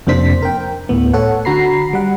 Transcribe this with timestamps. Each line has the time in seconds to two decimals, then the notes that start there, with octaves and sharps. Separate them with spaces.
0.07 F2 C3 A#3 D4 C5 B6
0.42 A#4 G5
0.89 D2 A2 B3
1.13 A4 C#5 F#5
1.45 D3 F#4 A#5 B5 C7
1.93 G3 F#5